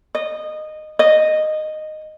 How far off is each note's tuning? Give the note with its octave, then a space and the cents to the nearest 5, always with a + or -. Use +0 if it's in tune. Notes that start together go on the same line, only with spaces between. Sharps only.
D#5 -20
D#5 -10